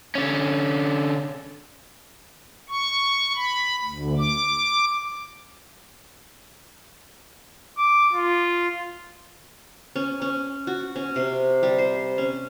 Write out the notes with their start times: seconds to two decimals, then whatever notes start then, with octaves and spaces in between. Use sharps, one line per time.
0.15 D3 C#4
2.69 C#6
3.36 B5
3.84 D2
4.18 D6
7.77 D6
8.13 F4
9.96 C#4
10.22 C#4
10.67 F#4
10.96 C#4
11.16 C3
11.63 G3
11.78 C5
12.18 C#4